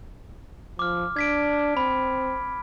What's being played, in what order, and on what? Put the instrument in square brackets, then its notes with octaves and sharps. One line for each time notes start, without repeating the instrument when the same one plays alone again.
[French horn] F3 [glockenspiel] D6 F6
[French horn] D4 [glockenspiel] G#6 B6 D7
[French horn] C4 [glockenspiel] B5